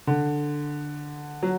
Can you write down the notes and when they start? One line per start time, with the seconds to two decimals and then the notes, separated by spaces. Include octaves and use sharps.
0.07 D3
1.43 F#3